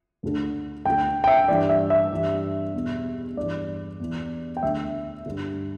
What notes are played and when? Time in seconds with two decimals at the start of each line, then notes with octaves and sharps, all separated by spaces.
0.23 D2 D3
0.85 D2 D3 G5
1.24 G5
1.27 E5
1.48 G2 E3 D5
1.69 E5
1.90 E5
2.11 G2 E3
2.74 E2 B2
3.37 G2 E3 D5
4.00 E2 E3
4.57 G5
4.63 D2 D3 E5
5.26 G2 D3